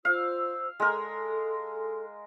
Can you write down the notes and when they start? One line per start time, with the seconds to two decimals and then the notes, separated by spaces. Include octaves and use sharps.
0.05 F4 C5 F5 E6
0.80 G#3 A4 A#4